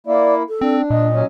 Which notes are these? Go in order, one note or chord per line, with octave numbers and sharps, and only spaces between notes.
A#3 E4 D5
A4
C4 D4
A#2 D#5
F#3 C#4